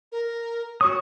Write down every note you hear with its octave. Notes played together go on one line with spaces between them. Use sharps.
A#4
F#4 C#5 C#6 D#6